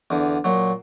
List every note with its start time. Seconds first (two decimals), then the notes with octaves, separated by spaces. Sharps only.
0.11 E2 D3
0.44 A#2 F#3